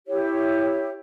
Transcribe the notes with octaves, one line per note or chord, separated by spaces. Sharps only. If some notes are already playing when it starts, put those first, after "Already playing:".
E4 G4 C#5